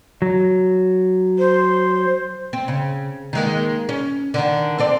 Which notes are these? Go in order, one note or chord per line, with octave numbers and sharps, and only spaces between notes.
F#3
C5
C4
C#3
D#3 G#3 A#3
C#4
D3 D#3
C4 A4 D5